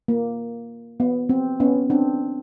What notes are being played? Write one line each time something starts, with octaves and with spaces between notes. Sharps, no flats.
A#3
B3
C4
B3 C#4
C4 D4